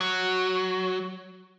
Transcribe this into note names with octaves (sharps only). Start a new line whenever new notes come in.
F#3